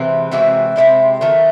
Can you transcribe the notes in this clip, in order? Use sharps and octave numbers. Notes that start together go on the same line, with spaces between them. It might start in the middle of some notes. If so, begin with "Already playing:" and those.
Already playing: C3 E3 G#3 C4
C3 E3 G#3 C4 F#4
C3 E3 G#3 C4 E4
D#3 F#3 A3